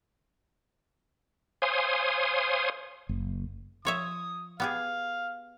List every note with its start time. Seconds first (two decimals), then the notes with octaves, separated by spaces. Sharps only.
1.62 C5 C#5 F5 G#5 C6 D#6
3.09 F#1
3.85 F3 C#5 E5 D#6
4.60 B3 G4 G#4 F5